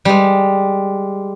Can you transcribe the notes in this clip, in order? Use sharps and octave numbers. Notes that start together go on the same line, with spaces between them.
G3 G#3